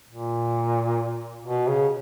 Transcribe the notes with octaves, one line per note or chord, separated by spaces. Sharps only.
A#2
B2
C#3